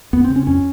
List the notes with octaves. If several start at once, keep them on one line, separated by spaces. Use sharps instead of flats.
F2 B3
C4
C#3
C#4
F2 C#4